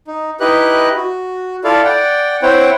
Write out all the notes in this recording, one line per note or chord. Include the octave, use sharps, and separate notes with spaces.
D#4
D#4 E4 G4 B4 D#5 F#6
F#4
E4 F4 A4 D5 F5
D5 F#5 G5
C4 E4 C5 C#5 F#5 G5